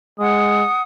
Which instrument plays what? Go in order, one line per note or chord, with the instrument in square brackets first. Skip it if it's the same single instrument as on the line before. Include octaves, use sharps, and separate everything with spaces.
[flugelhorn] G#3 [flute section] F#5 D#6